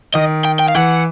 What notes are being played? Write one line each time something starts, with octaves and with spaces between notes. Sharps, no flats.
D#3 D#5
G5
G5
F5
E3 F#5